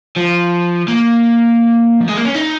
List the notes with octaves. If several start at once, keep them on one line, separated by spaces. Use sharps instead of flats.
F3
A#3
F3
G#3
A#3
C#4
D#4